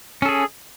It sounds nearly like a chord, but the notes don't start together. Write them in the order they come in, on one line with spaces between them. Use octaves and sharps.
C#4 A4 G#4